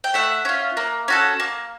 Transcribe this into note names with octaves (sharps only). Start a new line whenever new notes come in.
G5
A3 E5 F#5
C#4 F4
A#3
C#4 F#4 A4
A#3